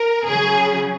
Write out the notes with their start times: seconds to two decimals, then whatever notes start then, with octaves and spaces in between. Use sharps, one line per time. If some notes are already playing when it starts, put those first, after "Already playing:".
Already playing: A#4
0.28 C#3 F#3 G#4